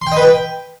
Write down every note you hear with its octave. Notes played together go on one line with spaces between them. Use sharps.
C6
G5
D#5
B4
G5